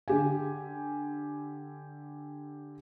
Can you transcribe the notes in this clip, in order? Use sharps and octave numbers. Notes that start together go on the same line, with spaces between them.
D3 G4 G#5